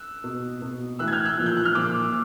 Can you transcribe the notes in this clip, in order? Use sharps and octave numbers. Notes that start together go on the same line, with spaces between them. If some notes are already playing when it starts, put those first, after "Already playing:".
Already playing: E6 F#6
B2
B2
A2 E3 E6 F#6
G#6
F6 G6
E6 F#6
A#2 F3
G6
F#6
F6
A#2 F3 D6 E6